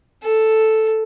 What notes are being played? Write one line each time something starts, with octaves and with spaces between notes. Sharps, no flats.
A4